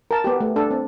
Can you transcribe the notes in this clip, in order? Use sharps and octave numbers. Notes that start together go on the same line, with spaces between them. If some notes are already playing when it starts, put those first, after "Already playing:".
A#4 A5
B3 G4
A3
D4 A4
C4